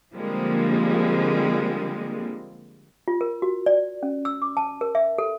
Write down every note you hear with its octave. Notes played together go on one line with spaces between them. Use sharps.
D3 F3 G3 G#3 A#3 C4
F4
A#4
F#4
D5
C#4
E6
D6
A5
A#4
E5
A4